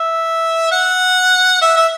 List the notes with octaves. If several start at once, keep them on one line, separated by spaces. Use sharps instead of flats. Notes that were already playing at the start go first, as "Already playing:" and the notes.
Already playing: E5
F#5
E5
E5